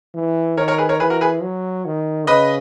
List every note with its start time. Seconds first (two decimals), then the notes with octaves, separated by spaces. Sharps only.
0.15 E3
0.57 D#3 A#4 C#5
0.68 A#4 C#5
0.78 G#4 B4
0.89 A#4 C#5
1.00 E3 G#4 B4
1.10 F#4 A#4
1.21 G#4 B4
1.42 F#3
1.85 D#3
2.27 C#3 B4 D#5